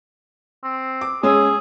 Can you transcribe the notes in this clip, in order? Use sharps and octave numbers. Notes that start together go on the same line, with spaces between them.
C4
D6
G#3 C#4 G#4 E6